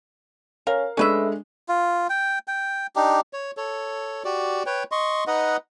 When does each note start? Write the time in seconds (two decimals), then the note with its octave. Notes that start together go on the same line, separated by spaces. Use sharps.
0.67 C#4 A#4 F5
0.97 G#3 A3 C#4 D4 B4 E5
1.69 F4
2.10 G5
2.48 G5
2.96 D4 D#4 G4
3.33 C#5
3.57 A4 C#5
4.25 F#4 G4 D5
4.66 B4 C#5 G5
4.92 D#5 C6 C#6
5.27 D#4 B4 D#5 F#5